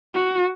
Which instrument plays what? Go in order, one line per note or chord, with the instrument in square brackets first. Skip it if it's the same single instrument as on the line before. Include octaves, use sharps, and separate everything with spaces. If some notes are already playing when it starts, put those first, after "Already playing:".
[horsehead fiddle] F#4